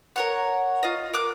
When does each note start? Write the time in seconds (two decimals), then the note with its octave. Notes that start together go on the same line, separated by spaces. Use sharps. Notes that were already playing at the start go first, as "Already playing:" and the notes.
0.16 A#4 C#5 F#5
0.83 F4 D#5
1.13 A#4 D6 F#6